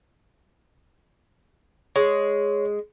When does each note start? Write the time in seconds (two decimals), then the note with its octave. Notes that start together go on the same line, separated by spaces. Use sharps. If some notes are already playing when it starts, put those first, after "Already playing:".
1.96 G#3 C#5